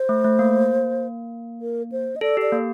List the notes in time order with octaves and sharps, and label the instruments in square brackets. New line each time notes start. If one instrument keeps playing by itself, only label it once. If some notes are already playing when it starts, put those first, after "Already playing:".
Already playing: [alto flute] C5
[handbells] A3
A3
A#3
[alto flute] A#4
C5
D#5
[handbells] A4 [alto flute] D5
[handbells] G4
[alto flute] D5
[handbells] A#3